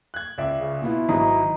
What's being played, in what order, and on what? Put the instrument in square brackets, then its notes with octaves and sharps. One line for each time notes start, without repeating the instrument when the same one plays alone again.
[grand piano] F#6 G#6
C#2 D5 E5
[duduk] C#3
[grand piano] B2 B3 F4 [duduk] E4
[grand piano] G#1 F#3 [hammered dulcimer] D#4